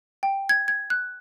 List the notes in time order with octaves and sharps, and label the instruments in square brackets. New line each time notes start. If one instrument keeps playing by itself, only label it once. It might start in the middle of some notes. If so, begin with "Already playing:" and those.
[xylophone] G5
G#6
G#6
F#6